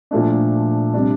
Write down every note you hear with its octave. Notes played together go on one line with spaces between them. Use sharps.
A#2 F3 A3 D4
C3 G3 D4